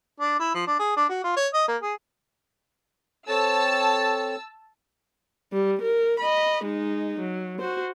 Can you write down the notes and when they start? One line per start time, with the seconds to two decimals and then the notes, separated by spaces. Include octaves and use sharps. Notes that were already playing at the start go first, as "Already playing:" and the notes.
0.20 D4
0.39 E4
0.54 F3
0.67 D4
0.79 G#4
0.96 D4
1.09 F#4
1.24 F4
1.37 C#5
1.54 D#5
1.68 A#3
1.82 G#4
3.29 C4 A4 C#5 A5 E6
5.53 G3
5.82 A#4
6.20 D#5 B5
6.63 G#3 D#4
7.20 F#3
7.59 F#4 C5